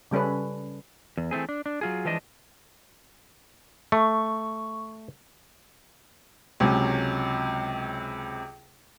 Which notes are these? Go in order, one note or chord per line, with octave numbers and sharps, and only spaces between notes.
C#3 G3 C#4 A4 B4
E2
E3 A3 C4 G#4
D4
D4
F#3 F4 G#4
E3 F3 G#3 D4 D#5
A3 C#6
C#2 C3 F#3 C#4